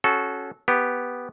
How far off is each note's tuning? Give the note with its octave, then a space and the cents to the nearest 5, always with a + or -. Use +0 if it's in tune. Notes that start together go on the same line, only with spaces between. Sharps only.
C#4 +0 F#4 +0 A4 -20
B3 +0 G4 +0